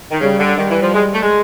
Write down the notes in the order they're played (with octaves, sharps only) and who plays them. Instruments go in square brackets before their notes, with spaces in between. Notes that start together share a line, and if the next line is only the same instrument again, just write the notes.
[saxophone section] D#3
[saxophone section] C#3 [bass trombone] G3
[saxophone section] D3
[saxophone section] D#3 [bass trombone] G3
[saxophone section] E3
F3
G#3
A3
G#3